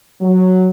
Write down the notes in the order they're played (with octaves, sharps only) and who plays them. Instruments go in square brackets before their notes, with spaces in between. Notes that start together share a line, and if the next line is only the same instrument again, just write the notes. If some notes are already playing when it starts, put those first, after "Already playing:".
[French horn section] F#3